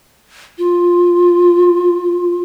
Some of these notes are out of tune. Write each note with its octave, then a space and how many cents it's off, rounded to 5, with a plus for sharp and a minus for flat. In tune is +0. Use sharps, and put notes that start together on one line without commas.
F4 +10